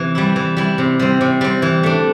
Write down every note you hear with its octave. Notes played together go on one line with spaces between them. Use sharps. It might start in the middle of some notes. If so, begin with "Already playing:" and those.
Already playing: C3 E3
G3 E4
E3
G3 E4
C3
G3 C4
C3
G3 C4
E3
A3 D4